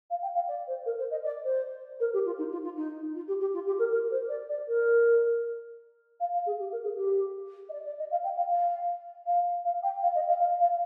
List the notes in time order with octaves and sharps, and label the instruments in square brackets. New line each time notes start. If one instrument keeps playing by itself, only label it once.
[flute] F5
G5
F5
D5
C5
A#4
C5
D#5
D5
C5
A#4
G4
F4
D#4
F4
F4
D#4
F4
G4
G4
F4
G4
A#4
A#4
C5
D5
D5
A#4
F5
F5
G#4
G4
A#4
G#4
G4
D#5
D5
D5
D#5
F5
G5
F5
F5
F5
F5
G5
F5
D#5
F5
F5
F5